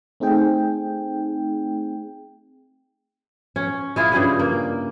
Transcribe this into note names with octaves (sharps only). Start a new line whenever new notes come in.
A3 C4 D#4 G#4 G5
C#4
G#3 E4 F4
G2 C#3 G3 G#4
A#3